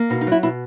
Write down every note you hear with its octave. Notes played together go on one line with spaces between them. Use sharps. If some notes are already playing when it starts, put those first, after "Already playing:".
Already playing: A#3
B2 D#4
D#4
F#3 E4
B2 E4